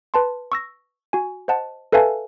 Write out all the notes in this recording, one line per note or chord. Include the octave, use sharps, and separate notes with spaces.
B4 A5 C6
C#6 E6 A#6
F#4 G#5
C5 D#5 F#5 A5
A4 B4 E5 F5 G#5 A5